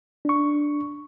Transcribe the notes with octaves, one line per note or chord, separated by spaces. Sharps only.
D4 C#6